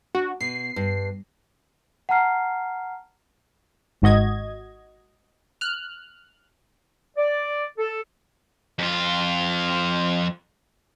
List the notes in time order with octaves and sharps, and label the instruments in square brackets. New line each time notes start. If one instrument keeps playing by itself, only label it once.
[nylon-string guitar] D4 [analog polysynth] F#4
[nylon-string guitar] B2 [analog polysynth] C7
[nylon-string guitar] G2
[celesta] F#5 A5 A#5 F6 C7
[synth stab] G#1 G#2 F#4 D#5 G#6
F6 F#6
[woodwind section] D5
A4
[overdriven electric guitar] F2 F4